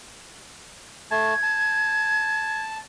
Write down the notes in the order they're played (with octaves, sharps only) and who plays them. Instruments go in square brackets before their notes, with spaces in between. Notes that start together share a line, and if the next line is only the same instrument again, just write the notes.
[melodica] A3 A5 [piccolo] G#6
[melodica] A5